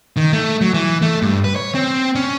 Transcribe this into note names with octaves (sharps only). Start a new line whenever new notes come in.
D#3
A3
F#3
E3
A3
G2
B4
C#5
C4
C#4